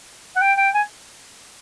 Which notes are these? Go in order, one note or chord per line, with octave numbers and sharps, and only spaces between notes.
F#5
G5
G5
G#5